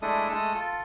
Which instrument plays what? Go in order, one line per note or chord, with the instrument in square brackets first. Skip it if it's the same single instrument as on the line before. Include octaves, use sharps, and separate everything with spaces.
[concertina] G#3 A3 D4 E4 A4 D#6
G#3 A3 A4 D#6 E6
F4 A4